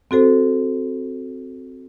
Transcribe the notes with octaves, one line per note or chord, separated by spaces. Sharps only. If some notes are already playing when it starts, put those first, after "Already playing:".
C4 F#4 A4 C5